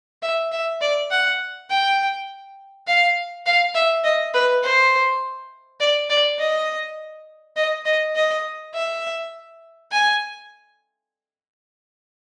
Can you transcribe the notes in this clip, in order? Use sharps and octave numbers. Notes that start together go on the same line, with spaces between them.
E5
E5
D5
F#5
G5
F5
F5
E5
D#5
B4
C5
D5
D5
D#5
D#5
D#5
D#5
E5
G#5